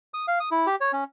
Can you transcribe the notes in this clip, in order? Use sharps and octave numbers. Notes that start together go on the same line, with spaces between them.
D#6
F5
D#6
E4
G4
C#5
C#4